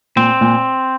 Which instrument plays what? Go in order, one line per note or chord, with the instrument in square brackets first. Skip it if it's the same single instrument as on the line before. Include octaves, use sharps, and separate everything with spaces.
[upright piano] A#2 [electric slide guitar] C4
[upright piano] A#2